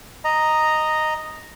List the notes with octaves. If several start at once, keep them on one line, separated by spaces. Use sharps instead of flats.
D#5 A#5